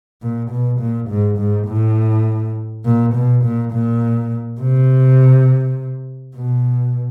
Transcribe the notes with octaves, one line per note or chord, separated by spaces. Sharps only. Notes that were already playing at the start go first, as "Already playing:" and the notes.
A#2
B2
A#2
G#2
G#2
A2
A#2
B2
A#2
A#2
C3
B2